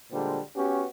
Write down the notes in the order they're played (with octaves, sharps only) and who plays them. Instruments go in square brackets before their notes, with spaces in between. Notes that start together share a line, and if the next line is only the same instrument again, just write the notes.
[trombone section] A#2 D3 G3 G#3 C5
B3 C#4 F#4 G4